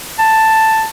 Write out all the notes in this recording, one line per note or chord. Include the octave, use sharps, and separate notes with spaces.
A5